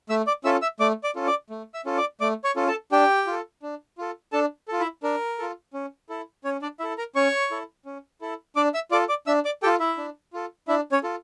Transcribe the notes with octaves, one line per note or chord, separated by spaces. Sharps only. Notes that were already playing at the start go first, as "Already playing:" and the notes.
A3 E5 E6
D5 D6
C#4 F4 A4 E5 E6
E5 E6
A3 D5 D6
D5 D6
C#4 F4 A4
D5 D6
A3
E5 E6
C#4 F4 A4
D5 D6
A3 D5 D6
C#5 C#6
C#4 F4 A4
A4 A5
D4 G4 G5
F4 A4
D4
F4 A4
D4 A4 A5
F4 A4
E4 E5
D4 A#4
F4 A4
C#4
E4 A4
C#4 C#5
D4 D5
E4 A4 E5
A#4 A#5
C#4 C#5 C#6
E4 A4
C#4
E4 A4
D4 D5 D6
E5 E6
F4 A4 D5 D6
D5 D6
D4 E5 E6
D5 D6
F4 G4 A4 G5
E4 E5
D4
F4 A4
D4 E4 E5
C#4 C#5
F4 A4